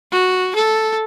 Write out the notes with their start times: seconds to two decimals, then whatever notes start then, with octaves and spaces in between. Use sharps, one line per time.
0.12 F#4
0.55 A4